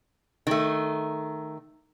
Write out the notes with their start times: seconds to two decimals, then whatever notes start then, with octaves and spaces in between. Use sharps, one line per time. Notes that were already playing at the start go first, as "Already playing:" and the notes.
0.47 D#3 A3